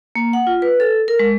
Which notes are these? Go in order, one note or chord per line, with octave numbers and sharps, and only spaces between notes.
A#3
F#5
F4
B4
A4
A#4
G#3